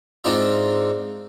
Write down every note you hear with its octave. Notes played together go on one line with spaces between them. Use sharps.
G#2 C4 D4 D#4 F4 E5